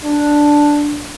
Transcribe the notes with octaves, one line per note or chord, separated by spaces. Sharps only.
D4